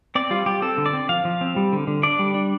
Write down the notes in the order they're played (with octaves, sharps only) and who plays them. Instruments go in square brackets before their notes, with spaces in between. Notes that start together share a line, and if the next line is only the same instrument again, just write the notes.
[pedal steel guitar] C4 D5
G3 F4
G3 G4
C4 A4
D3
D5
C4
F3 F5
F3
C4
G3
D3
D3
D4 D5
G3
D4